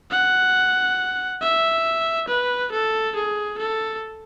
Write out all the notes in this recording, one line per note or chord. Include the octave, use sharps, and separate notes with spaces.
F#5
E5
B4
A4
G#4
A4